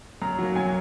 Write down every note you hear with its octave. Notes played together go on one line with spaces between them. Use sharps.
F#2 A#5
F#3 A#3
F#2 G#5